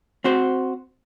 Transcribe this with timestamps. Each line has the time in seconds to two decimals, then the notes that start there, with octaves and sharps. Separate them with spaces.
0.24 C4 F#4 C5